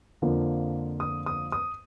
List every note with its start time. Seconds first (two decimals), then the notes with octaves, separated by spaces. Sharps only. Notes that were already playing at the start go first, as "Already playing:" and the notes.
0.22 F2 D3 F3 A#3
1.00 D#6
1.26 D#6
1.52 D#6